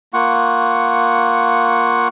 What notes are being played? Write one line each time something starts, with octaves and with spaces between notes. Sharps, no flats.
A#3 F4 F#5 C#6